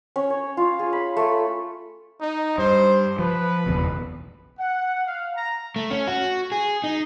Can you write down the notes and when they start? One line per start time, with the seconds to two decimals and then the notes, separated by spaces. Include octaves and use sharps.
0.16 C#4
0.30 C#5
0.57 F4
0.79 G#4
0.93 B5
1.17 A3
2.21 D#4
2.58 G2 C5
3.19 F3 B4
3.66 F#1 B1 E2
4.59 F#5
5.06 F5
5.36 A#5
5.76 A3
5.90 C#4
6.08 F#4
6.52 G#4
6.84 D#4